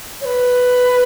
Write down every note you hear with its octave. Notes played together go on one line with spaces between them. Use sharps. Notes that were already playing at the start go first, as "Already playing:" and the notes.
C#5
B4